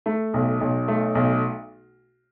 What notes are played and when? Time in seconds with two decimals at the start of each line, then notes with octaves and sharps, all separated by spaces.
0.06 A3
0.34 B1
0.61 B1
0.88 A3
1.15 B1